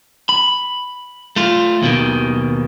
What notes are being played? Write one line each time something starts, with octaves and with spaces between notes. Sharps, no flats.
B5
A3 F4
D#2 B2 D#3